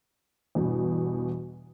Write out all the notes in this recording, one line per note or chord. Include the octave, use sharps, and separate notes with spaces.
E2 G2 B2